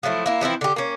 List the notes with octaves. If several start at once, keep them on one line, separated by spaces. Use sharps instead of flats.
F3 F#3 A3 E4
A#3 E4
E3 F3 C4 E4
D3 G4
A#3 C#4